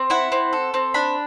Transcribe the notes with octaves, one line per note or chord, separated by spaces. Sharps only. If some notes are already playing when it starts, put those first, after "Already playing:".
Already playing: C4
E4 F#5
C4
A4
C4
D4 B5